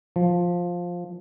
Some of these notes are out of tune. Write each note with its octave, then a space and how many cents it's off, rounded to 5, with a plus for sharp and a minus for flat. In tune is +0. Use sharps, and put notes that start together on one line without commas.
F3 +10